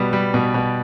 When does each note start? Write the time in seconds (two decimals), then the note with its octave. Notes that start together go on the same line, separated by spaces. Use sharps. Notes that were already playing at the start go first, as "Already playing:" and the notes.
Already playing: B2 G3 B3
0.13 G3
0.34 B2
0.54 B2